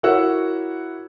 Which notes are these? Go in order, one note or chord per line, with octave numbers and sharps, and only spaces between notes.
E4 F#4 A#4 C#5 F#5 E6